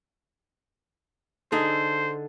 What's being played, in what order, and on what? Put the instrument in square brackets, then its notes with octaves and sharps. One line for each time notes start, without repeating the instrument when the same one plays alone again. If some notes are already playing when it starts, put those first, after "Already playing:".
[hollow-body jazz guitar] D3 D#4 G#4 [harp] A4 [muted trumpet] C5